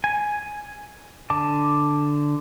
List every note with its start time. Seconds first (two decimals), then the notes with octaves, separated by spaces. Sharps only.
0.04 G#5
1.30 D3 A5 D6